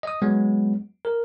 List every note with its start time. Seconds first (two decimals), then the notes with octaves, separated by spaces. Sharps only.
0.03 D#5 D#6
0.22 F#3 G#3 B3
1.05 A#4